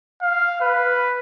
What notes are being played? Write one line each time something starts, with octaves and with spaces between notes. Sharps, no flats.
F5
B4